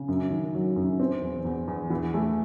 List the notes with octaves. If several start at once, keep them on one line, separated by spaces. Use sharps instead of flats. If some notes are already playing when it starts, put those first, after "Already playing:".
Already playing: C#3
F#2
D#3
F#3
F#2
C4
E2
E2
E2
E3
A3